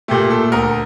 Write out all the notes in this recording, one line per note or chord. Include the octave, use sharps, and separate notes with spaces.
A#2 A3 G4
A4
D2 A#4